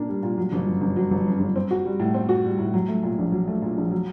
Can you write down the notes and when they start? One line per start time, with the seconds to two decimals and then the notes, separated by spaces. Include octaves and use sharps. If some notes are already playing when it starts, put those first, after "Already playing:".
Already playing: A#2 A#3 D4
0.08 G3
0.23 A#2
0.38 F#3
0.52 G1
0.67 F#2
0.81 G1
0.96 F#3
1.11 G1
1.27 F#2
1.40 G1
1.56 C4
1.71 F#4
1.85 G3
2.00 A2
2.14 C4
2.29 F#4
2.44 G3
2.59 A2
2.74 F#3
2.88 A3
3.03 A#2
3.18 A#1
3.32 F#3
3.47 A3
3.62 A#2
3.78 A#1
3.91 F#3